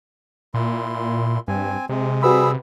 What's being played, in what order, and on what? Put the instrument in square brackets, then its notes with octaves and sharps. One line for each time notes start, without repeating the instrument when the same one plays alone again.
[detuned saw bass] A#2 [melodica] E4 C6
[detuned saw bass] G2 [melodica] C4 G#5
[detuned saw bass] C3 [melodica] G#3
[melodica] G3 G#4 E6 [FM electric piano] F#4 B4 B5